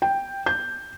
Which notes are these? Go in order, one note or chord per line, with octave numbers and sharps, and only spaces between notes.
G5
G6